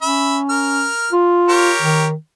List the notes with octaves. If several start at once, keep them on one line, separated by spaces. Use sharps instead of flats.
C#4 E5 B5
A#4 F6
F4
G4 A#4 C#5
D#3